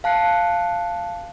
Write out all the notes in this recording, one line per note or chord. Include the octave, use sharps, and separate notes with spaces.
F5 A5 F#6 C7 C#7